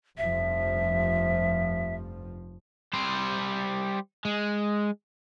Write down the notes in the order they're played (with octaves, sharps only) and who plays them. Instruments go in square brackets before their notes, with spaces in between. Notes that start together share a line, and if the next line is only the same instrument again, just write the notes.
[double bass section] F1 G2 F3 [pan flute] E5
[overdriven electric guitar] G3 C5
G#3